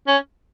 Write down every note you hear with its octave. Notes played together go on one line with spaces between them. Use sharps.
C#4